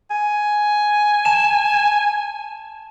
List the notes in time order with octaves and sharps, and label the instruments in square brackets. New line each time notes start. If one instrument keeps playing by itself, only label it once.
[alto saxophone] G#5
[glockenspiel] A5 E7